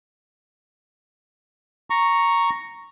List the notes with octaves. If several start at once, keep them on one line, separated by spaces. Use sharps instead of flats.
A#5 C#6